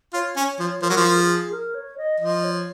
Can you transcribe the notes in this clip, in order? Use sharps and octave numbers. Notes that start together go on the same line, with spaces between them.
F4 C#5
C#4
F3
F3 A#4
F#3
F3
G#4
A#4
C#5
D#5
F3 D#5
C#5